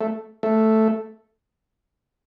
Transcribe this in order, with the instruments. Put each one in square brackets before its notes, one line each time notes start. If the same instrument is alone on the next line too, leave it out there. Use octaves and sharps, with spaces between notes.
[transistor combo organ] A3
A3